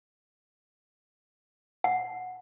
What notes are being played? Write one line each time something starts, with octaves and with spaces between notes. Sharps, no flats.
F#5